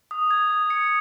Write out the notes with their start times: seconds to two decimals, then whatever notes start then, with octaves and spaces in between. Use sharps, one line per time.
0.11 D#6
0.31 G#6
0.50 D#6
0.70 C#7